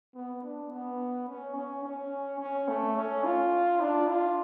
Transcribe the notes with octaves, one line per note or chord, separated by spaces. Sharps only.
B3
D4
B3
C#4
C#4
C#4
C#4
A3
C#4
F4
D4
F4